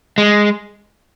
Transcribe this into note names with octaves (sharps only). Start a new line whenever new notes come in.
G#3